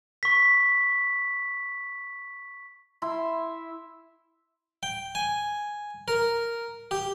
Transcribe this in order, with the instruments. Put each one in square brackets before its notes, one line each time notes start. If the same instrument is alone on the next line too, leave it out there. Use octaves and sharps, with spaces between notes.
[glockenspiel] C#6 B6
[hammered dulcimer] E4 E5 C6
[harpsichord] G5
G#5
A#4
G4